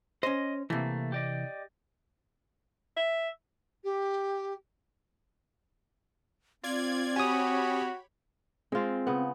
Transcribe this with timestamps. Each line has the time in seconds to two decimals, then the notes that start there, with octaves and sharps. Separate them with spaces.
0.23 C#4 C5 D#5
0.70 C3 E3 A3 A#3
1.12 G4 D5 D#5
2.97 E5
3.84 G4
6.63 C4 F4 D5 G#6
7.16 F#4 G4 C#5 G#5 B5 D#6
8.72 G#3 C4 F4
9.07 C#3 B3